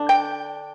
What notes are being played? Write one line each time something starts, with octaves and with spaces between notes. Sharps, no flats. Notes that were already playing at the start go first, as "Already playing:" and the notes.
Already playing: D3 D4
G5